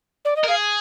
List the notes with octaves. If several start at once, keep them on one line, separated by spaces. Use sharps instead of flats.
D5
D#5
A#4
G#4 F5